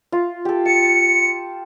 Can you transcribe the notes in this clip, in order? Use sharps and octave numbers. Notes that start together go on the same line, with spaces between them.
F4
G4 A4
A5 C#7